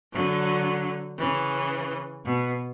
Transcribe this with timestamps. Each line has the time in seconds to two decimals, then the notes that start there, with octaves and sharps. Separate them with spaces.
0.13 D3 F#3
1.19 C#3 E3
2.25 B2